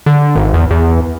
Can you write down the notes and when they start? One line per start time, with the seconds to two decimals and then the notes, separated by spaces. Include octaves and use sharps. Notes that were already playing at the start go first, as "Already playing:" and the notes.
0.06 D3
0.35 G#1
0.54 E2
0.71 E2